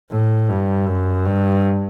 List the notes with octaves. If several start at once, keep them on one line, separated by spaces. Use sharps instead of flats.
A2
G2
F#2
G2